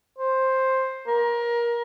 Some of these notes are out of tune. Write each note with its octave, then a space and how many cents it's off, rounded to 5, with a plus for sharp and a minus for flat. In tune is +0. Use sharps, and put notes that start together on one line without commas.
C5 +10
A#4 +25